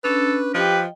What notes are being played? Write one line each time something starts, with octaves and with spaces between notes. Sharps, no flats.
C#4 D4 A4 B4
F3 G4 B4 D#5 G5